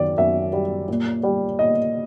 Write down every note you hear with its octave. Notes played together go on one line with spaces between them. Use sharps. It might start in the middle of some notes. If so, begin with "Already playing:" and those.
Already playing: F#2 D#3 D5
F#2 E5
G3
A#2
G3
A#2 D#5